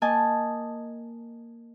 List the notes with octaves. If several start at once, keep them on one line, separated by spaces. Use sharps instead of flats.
A#3 D#5 G#5 A5